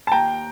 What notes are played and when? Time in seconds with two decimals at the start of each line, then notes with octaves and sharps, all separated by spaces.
0.07 A5
0.12 D#2 G5 A#5